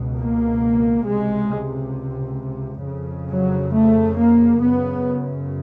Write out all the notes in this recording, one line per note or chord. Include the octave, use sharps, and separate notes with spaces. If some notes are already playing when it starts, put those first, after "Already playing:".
Already playing: C#2 B2
A#3
C#2 C3 G#3
F2 C#3
F#3
A3
A#3
F#2 C#3 B3